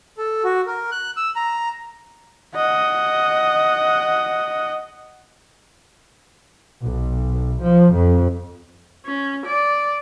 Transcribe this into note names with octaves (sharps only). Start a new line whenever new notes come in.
A4
F#4
A#4
F#6
E6
A#5
D#5 F#5
B1
F3
F2
C#4
D5